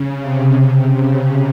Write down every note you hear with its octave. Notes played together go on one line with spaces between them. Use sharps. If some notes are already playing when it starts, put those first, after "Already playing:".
Already playing: C#3
C3
C3
C#3